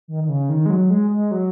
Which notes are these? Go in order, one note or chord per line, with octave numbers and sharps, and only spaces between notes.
D#3
D#3
C#3
D#3
G#3
F#3
G#3
G#3
F#3